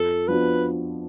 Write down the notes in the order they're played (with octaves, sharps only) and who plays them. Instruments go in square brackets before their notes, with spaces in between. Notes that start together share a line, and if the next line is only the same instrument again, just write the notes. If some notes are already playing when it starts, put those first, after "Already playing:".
Already playing: [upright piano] F2 [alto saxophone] A4
[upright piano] F3 B3 D4 F#4 [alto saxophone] B4